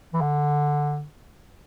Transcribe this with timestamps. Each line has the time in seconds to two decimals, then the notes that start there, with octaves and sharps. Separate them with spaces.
0.13 E3
0.21 D3